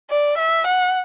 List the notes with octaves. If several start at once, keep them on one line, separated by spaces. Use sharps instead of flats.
D5
E5
F#5